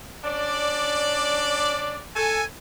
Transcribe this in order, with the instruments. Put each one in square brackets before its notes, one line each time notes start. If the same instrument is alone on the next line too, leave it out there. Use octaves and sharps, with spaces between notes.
[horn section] C#4 D4 D5
A4 G#5